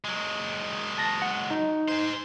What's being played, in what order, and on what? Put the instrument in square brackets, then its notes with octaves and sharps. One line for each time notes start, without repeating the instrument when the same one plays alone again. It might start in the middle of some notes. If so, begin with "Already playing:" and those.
[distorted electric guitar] F#3 G#3
[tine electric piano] A5 A#6
F#5
D#4
[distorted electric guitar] G#4 C5